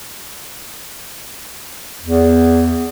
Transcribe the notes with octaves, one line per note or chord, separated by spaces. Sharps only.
E2